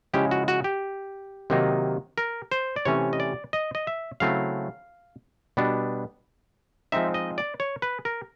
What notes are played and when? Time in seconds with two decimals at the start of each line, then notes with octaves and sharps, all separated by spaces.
0.14 C#3 F3 G#3 C#4 E4 G4
0.31 F#4
0.48 F#4
0.64 G4
1.50 C3 D#3 F#3 A#3 D#4
2.18 A#4
2.52 C5
2.76 D5
2.85 C3 E3 A3 C#4 C#5
3.13 D#5
3.20 D5
3.53 D#5
3.75 D#5
3.87 E5
4.20 C#3 F#3 A3 C4 E4 F5
5.57 B2 G3 B3 D4
6.92 F3 G#3 C4 D#4 E5
7.14 D#5
7.38 D5
7.60 C#5
7.82 B4
8.05 A#4